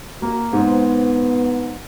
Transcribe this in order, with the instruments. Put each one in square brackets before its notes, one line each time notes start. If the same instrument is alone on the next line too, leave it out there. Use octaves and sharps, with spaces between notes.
[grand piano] A#3 [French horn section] F#4
[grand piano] G#2 C4 [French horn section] B3